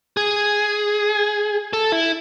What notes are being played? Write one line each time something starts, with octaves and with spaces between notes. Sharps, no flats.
G#4
A4
E4